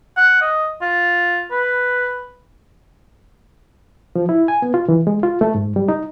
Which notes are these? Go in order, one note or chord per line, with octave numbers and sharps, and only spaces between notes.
F#5
D#5
F4
B4
F3
E4
G#5
B3
F4
E3
G#3
F4
A3
G#2
G3
D#4